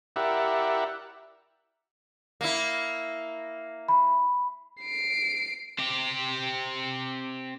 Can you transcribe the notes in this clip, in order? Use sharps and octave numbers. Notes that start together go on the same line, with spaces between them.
E4 G4 A#4 D5 E5 F#5
A#3 E4
B5
C7 D7
C4 G4